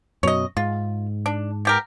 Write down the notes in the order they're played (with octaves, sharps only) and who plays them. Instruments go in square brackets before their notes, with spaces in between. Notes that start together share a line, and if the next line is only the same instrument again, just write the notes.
[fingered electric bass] F#2 B2 F#3 [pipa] C#5 D#5
[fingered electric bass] G#2 [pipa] F4
[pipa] D4
B2 G4 A#4